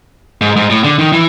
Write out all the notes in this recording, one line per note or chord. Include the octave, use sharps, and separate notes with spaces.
G#2
G#2
A2
D3
D#3
E3